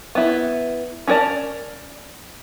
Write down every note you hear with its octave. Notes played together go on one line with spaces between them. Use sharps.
B3 E4
C#4 D#4 A#4 D5 A5